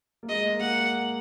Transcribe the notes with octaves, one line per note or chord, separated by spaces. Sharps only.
A#3
G#3 D#5
A#3
A#3 F#5